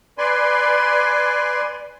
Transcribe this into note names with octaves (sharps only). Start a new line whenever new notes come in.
B4 D5 G#5 C6